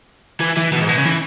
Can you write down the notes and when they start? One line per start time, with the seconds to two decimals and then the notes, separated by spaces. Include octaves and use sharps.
0.40 E3
0.57 E3
0.72 B2
0.80 G#2
0.88 B2
0.97 C#3
1.06 E3